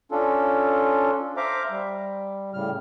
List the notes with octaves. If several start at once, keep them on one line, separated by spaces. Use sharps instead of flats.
C#4 D4 F4 A4
C5 E5 F5 A#5 D6
G3
A2 C#3 G3 F6